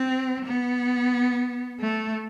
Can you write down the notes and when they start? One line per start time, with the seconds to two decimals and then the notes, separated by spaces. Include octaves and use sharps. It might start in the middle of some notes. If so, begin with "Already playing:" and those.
Already playing: C4
0.45 B3
1.80 A3